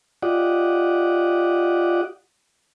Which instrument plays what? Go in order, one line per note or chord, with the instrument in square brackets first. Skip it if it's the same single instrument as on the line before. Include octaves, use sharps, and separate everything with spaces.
[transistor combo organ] F4 G4 D5 D#5 F#5